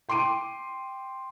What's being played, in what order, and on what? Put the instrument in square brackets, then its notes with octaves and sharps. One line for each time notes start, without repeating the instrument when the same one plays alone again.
[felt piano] G5 C6 D6 D7 D#7